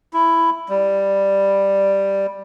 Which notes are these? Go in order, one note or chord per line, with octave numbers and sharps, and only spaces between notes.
E4
G3